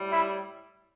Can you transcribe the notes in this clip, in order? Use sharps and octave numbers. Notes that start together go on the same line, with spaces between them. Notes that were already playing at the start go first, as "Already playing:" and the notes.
Already playing: A2 G3
E4